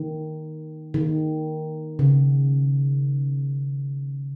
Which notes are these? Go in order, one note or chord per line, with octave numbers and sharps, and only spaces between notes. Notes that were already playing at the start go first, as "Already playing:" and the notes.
Already playing: D#3
D#3
C#3